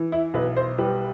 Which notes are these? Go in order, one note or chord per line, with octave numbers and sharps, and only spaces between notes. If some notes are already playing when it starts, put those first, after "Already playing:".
Already playing: E3
E4
B1 B4
C5
G3 B4